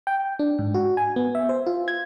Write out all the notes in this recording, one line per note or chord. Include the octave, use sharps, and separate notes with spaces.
G5
D4
G#2
F#4
G#5
B3
E5
C5
F4
G#6